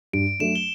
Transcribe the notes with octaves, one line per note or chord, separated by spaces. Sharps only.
G2 D7
F#3 A3 D4 E7
G7